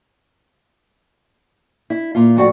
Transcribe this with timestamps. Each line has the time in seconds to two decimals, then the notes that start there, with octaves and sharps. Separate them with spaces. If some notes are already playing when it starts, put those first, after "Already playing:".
1.90 E4
2.15 A#2 F4
2.37 F2 A2 F#4 D5 F#5